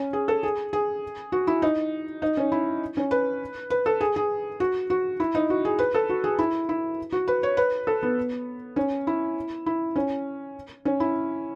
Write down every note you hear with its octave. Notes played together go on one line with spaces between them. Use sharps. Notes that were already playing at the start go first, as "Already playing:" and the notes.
Already playing: C#4
G#4
A4
G#4
G#4
F#4
E4
D#4
D#4
C#4
E4
C#4
B4
B4
A4
G#4
G#4
F#4
F#4
E4
D#4
F#4
G#4
B4
A4
F#4
G#4
E4
E4
F#4
B4
C#5
B4
A4
B3
C#4
E4
E4
C#4
C#4
E4